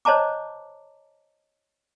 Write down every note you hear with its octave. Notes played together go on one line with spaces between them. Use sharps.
C5 C#5 D#5 A5 A#5 D6